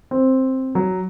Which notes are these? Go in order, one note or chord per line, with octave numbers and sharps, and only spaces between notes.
C4
F#3